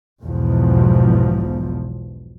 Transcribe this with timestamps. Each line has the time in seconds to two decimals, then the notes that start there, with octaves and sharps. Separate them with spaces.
0.24 B1 E2 G#2 B2 F3